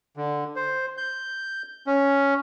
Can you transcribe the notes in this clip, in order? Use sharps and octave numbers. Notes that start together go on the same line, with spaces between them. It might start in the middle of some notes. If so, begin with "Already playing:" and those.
D3
C5
G6
C#4